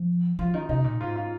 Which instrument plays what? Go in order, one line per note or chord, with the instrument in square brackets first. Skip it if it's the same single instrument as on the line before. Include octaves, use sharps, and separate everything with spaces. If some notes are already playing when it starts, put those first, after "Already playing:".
Already playing: [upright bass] F3
[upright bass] F3 [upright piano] F4
[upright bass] D#3 [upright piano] D#4
[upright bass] C3 [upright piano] D#4
[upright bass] A#2
[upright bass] G#2 [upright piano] F4
[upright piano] F4